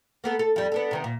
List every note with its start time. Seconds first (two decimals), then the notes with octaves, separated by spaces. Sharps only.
0.24 A#3 B3 A4
0.39 A4
0.56 F2 G3
0.72 B3 D4 A4
0.91 C3 D#3 B3
1.04 A#2